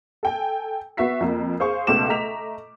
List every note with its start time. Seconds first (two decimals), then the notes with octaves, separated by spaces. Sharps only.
0.23 A4 G5 G#5
0.97 B3 F#4 E5 B6 C7
1.21 F2 A#3
1.60 G#4 C5 F5 C#6
1.87 C#2 B2 A3 A5 D6 E7
2.09 A3 D#5 A#5 B6 F7